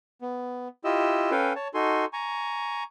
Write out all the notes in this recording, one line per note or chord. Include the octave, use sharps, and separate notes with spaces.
B3
E4 F4 G4 D#5 E6
C#4 A4 B4 F5 G5 G#5
C#5 A5
D#4 F#4 A4 G#5 C6
G#5 A#5 C#6